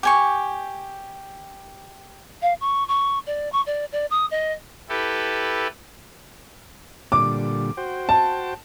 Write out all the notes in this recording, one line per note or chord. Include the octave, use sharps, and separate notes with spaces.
G4 G#5 C#6
F5
C#6
C#6
D5
C#6
D5
D5
D#6
D#5
E4 G4 A4 B4
A#2 D3 G3 D6
F#4 C5 G5
A5